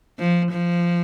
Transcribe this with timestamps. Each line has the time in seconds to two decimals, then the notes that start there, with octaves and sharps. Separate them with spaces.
0.19 F3
0.52 F3